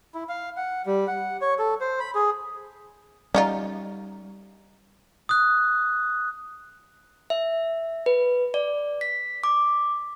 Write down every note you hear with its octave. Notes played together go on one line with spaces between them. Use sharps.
E4
F5
F#5
G3
F#5
C#5
A4
C5
B5
G#4
G3 C#4 D#4 F4 D5 F#5 A#5
D#6 F#6
E5
B4
D5
B6
D6